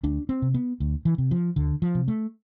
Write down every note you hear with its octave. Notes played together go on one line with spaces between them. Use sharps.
D2 D4
C4
C3
B3
D2
E3
C3
F3
D2 D3
F3
C3
A3